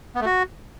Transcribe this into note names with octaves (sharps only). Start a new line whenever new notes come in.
B3
A3
F#4